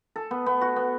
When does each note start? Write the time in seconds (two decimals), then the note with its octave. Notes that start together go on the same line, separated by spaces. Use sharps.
0.16 A4
0.31 B3
0.46 B3
0.61 F#4
0.76 B3